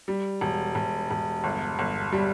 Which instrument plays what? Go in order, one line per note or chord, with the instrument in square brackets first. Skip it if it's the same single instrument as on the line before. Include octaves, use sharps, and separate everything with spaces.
[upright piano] G3
E1
E1
E1
G1
G1
G3